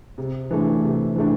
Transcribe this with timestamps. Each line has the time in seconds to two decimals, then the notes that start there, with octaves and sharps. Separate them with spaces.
0.18 C3
0.51 E3 A3 D4
0.83 C3
1.16 E3 A3 D4